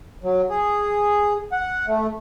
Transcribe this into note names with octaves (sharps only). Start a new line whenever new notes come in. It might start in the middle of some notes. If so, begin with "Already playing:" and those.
F#3
G#4
F#5
A3